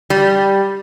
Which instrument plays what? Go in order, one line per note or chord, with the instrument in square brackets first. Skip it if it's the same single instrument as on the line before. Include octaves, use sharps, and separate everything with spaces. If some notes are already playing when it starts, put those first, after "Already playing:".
[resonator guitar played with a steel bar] G3